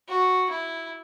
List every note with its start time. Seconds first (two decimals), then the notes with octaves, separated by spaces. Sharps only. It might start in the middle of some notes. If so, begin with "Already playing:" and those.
0.09 F#4
0.51 E4